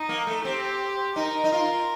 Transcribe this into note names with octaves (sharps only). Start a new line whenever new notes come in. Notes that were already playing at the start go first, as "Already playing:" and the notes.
Already playing: D#4
A#3
A3
C4 G4
D#4 A#4
D#4
F4